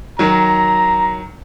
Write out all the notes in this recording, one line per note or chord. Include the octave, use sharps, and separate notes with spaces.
D#3 F#3 A#5